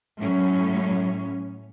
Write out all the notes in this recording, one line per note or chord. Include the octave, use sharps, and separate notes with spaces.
A2 F#3 C#4